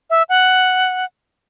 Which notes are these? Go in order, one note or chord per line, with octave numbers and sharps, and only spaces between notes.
E5
F#5